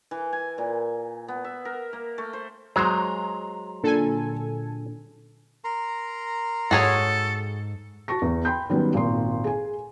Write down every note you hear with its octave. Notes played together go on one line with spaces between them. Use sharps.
E3
G#5
A#2
B3
E5
A#4
A#3
A3
C5
F#3 G#3 C5 A#5 C6
A#2 D3 A4 G#5
A#4 A#5 C6
G#2 F#4 G#4 A4 C#5
F#4 A5 C#6 A#6
E2
G5 B5 C6 G6
D#3 F#3 G3 B3 C#4
G#1 A#2 C6
G#4 G#5